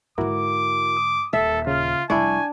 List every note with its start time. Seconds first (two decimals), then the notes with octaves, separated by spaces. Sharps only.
0.18 G#2 D3 E4 F#4 A#4 D6
0.97 D#6
1.33 D#1 A4 E5
1.67 C#3 F4 F6
2.10 F1 C2 G3 D4 E4 G#5 C#6